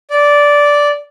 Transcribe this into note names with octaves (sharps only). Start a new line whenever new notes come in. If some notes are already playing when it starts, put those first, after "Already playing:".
D5